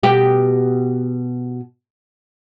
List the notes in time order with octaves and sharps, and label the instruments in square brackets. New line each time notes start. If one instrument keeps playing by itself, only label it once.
[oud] B2 G4